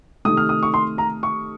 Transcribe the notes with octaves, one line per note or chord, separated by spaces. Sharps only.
C3 D#3 A3 D#6
F6
D#6
C#6
C6
A#5
C#6